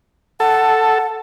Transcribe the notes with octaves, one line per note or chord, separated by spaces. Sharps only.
A4 F#5